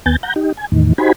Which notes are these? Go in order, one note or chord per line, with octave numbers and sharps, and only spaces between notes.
D#2 B3 G#5 G6 A6
F#5 A#5 G6
D#4 G4
G#5
E2 A2 D#3
D#4 F#4 G4 C5 G#5 B5